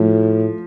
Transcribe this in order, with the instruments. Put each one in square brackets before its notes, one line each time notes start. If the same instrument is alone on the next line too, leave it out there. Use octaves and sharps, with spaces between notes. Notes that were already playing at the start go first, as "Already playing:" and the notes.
Already playing: [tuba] A2 [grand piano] F3